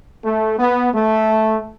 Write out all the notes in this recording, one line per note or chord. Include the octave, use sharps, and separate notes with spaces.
A3
B3
A3